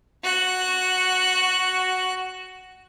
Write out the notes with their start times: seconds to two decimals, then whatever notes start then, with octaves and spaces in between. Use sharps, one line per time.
0.23 F#4 F#6